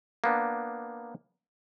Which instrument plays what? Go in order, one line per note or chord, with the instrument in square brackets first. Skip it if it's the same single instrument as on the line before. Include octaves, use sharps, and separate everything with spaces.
[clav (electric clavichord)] A#3 B3 D4